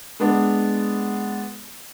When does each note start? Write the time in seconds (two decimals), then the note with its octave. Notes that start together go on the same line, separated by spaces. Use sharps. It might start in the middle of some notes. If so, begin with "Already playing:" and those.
0.20 G#3 B3 D4